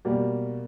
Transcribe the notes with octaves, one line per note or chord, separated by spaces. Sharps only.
B2 G3 A#3